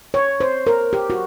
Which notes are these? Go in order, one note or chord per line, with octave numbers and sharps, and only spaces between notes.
C#5
C5
A#4
G4
F#4